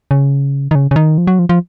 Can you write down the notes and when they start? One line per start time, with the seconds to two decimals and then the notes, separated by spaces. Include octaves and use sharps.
0.11 C#3
0.71 D#3
0.75 C#3
0.91 C#3
0.96 D#3
1.18 F3
1.27 F#3
1.39 F3
1.49 F3